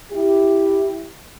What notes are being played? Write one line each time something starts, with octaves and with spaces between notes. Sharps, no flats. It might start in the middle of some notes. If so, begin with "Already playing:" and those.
E4 G4